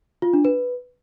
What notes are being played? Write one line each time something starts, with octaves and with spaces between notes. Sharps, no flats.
F4
D4
B4